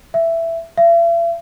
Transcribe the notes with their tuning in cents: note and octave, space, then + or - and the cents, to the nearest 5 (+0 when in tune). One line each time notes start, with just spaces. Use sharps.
E5 +10
E5 +45